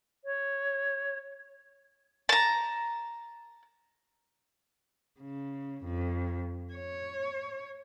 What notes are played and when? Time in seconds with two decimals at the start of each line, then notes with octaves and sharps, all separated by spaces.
0.25 C#5
2.29 A5 A#5
5.20 C#3
5.84 F2
6.73 C#5